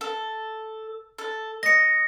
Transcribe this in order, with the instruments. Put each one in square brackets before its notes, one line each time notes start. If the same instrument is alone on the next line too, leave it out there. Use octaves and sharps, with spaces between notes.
[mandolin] A4
A4
[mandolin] D#5 [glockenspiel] A#6 C#7